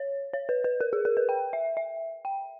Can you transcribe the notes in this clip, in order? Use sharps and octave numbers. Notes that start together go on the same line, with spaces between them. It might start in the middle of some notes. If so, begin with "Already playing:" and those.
Already playing: C#5
C#5
B4
B4
A#4
G#4
A#4
B4
G5
E5
E5
G5